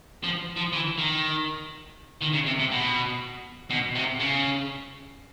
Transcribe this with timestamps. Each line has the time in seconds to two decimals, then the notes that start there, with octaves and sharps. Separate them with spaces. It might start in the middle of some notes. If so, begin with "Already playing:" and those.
0.24 F3
0.57 F3
0.73 E3
0.98 D#3
2.22 D#3
2.34 C#3
2.46 C3
2.59 C3
2.71 B2
3.70 B2
3.95 C3
4.20 C#3